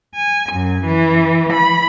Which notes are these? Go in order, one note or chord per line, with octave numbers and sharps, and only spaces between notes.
G#5
F#2
E3
B5